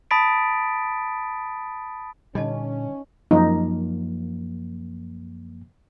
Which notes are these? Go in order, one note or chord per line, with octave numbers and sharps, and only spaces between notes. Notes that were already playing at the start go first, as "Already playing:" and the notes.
A5 B5 D#6 A6 B6 D7
A#2 D3 G3 C#4 D#4 D#5 A5
F#2 F3 A#3 D#4